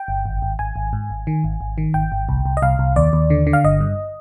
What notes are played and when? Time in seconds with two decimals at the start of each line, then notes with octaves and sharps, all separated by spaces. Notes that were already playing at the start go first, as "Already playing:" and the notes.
Already playing: G5
0.08 G1
0.26 G#1
0.42 G#1
0.59 G#1 G#5
0.76 G#1
0.93 G#2
1.10 G#1
1.27 D#3
1.44 G#1
1.61 G#1
1.78 D#3
1.94 G#1 G5
2.12 G#1
2.29 C2
2.45 C2
2.57 D#5
2.62 C2 F5
2.79 C2
2.96 D#2 D5
3.13 D#2
3.30 D3
3.47 D3
3.53 F5
3.64 G1 D#5
3.81 G2